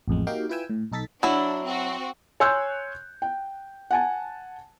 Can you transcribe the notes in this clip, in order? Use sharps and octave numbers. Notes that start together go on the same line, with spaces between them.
A1 F2 G#3
A#3 D#4 F#4 G4 F5 G5
E4 F4 B4 G5 G#5 E6
A2
B1 D#4 A4 A6 B6
F#3 D4 E4
C4 F#4
C#5 G#5 C6 E6 F#6 G6
G5
F#5 G#5 A5